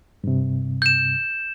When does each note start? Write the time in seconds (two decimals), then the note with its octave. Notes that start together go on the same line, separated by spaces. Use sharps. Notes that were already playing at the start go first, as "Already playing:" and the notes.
0.24 G2 C3
0.82 G6 E7